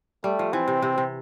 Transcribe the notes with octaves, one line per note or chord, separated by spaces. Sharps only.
G3 A3
F3
E3 C4
C3
C3
C3